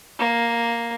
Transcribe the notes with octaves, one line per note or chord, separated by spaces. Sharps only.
A#3